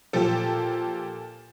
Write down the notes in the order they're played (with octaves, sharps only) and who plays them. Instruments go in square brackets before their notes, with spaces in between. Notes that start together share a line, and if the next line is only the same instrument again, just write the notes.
[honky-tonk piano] A#2 F3 G4 A4